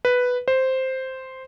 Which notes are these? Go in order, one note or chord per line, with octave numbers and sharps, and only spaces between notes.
B4
C5